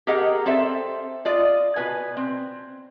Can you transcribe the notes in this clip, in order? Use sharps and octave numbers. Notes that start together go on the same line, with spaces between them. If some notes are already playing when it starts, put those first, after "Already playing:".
G4 G#4 A#4 D#5 F#5
C4 A4 C5 D5 E5
F4 D5 D#5
B2 B4 G#5
C4